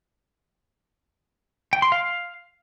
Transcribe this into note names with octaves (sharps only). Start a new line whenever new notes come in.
G5
C6
F5